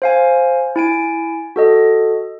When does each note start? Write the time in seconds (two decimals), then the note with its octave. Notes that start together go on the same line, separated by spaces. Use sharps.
0.02 C5 F5 G#5
0.76 E4 G#5 D7
1.56 F#4 A4 D#5